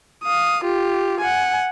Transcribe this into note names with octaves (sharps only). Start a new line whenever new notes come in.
F5 D#6
F4 G4
F#5 G#5